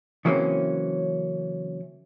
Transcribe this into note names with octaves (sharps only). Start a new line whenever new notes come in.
C#3 E3 F#3 A#3 C4 C#4